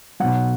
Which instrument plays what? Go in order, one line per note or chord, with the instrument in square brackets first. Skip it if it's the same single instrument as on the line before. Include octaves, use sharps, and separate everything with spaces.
[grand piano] B1 B2 F#3 F#5